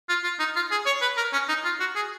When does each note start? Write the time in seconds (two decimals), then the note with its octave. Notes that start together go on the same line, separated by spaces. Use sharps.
0.09 F4
0.24 F4
0.39 D#4
0.56 F4
0.71 G#4
0.86 C#5
1.02 B4
1.17 A#4
1.33 C#4
1.49 D#4
1.64 F4
1.80 F#4
1.96 G#4